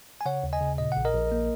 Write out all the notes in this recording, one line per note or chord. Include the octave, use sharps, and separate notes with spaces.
G#5
C#3 C#5 F#5
D#2
D#5 G#5
C#3
A#2 D#5
A#1 F#5
A#4 D#5
A#1
A#3